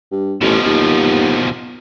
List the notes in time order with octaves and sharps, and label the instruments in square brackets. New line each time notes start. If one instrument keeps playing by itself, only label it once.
[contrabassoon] G2
[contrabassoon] A1 [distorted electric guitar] B2 F3
[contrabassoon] D#2